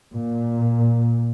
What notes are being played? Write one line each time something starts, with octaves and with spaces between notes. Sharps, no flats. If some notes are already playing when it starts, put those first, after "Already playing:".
A#2